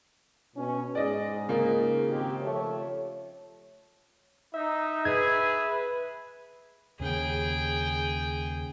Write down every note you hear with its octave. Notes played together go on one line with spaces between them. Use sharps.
B2 C#4
G#2 G#4 D5 D#5
C#3 A#3 F4
D#3 C4 G4
F3 A3 C#5
D#4 E5
G#4 B4 G#6
D#2 C#3 G#4 G5